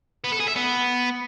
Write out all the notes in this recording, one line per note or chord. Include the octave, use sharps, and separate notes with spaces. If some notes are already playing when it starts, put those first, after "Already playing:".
B3
A4
G#4
E5
B3